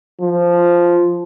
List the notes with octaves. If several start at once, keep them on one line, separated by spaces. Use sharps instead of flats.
F3